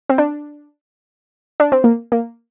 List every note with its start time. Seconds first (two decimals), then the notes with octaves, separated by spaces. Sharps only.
0.09 C4
0.18 D4
1.60 D4
1.72 C4
1.84 A#3
2.12 A#3